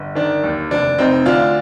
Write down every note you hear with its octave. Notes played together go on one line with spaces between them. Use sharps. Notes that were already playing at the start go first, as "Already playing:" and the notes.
Already playing: G1
D#3 D4
D#2
F1 D4
F1 C4 D#4
D2 D4 F4